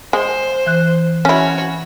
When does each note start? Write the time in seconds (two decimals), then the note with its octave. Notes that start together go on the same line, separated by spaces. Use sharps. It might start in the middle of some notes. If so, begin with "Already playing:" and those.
0.13 G#3 C5
0.66 E3 F#6
1.25 C#4 E4 F#4 C#5